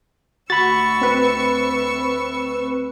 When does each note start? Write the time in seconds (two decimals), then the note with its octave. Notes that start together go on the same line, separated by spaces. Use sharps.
0.50 D2 F#4 B5 C#6 E6 A6
1.01 C4 B4